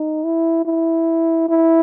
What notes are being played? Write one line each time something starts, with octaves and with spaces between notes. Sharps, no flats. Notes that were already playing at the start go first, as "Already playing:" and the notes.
Already playing: D#4
E4
E4
E4